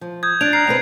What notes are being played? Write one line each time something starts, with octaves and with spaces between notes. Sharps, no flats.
F3
D#6 G6 G#6
D4 F#6 G#6 A6 D7 F7
A#5 F6 A#6 C7
B2 C4 B4 F7